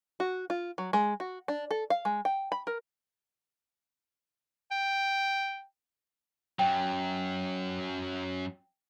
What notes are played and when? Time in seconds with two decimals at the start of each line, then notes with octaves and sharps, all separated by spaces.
0.20 F#4
0.50 F4
0.78 F#3
0.93 G#3
1.20 F#4
1.48 D4
1.71 A4
1.90 F5
2.05 G#3
2.25 G5
2.52 B5
2.67 A#4
4.71 G5
6.59 F#2 F#3 G5